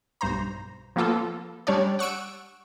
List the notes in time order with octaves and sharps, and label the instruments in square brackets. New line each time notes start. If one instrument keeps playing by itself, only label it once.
[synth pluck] B1 G2 C5 A#5
F3 A#3 B3 F4 A4
G3 C#4 D4 C#5 D5
F#5 C#6 E6 D7